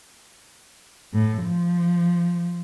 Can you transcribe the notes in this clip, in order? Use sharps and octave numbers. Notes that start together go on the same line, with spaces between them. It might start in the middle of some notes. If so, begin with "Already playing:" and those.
A2
F3